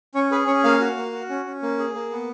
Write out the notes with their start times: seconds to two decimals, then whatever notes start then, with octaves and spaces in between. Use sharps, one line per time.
0.14 C#4 C#5
0.31 G#4 B4
0.47 C#4 C#5
0.64 A#3 F5
0.80 F#4
0.97 A#3
1.12 F#4
1.29 C#4
1.46 C#4
1.62 A#3
1.79 G#4
1.94 A#3
2.11 B3